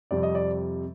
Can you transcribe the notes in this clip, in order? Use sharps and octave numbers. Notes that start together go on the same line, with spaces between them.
F2 C3 G3 D5
D#5
D5